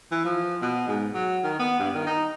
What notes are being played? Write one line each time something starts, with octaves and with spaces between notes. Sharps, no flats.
E3
F3
B2
G#2
F#3
D#3
B3
G2
D#3
D#4